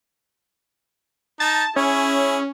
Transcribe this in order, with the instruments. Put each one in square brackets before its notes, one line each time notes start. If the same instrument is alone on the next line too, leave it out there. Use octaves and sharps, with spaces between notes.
[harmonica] D#4 [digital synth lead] A5
[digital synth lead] C#4 [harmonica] E4 G#4